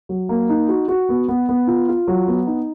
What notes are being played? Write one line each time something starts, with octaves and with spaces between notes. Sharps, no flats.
F#3
A#3
D#4
F#4
F#4
B3
B3
B3
F4
F4
F#3
B3
D#4